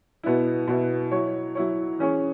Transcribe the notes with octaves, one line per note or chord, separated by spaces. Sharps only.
B2 B3 E4
B2 B3 E4
F#3 E4 C#5
F#3 E4 C#5
E3 C#4 G#4 C#5